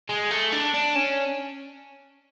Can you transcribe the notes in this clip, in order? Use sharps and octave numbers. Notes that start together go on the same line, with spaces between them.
G#3
A3
D4
D4
C#4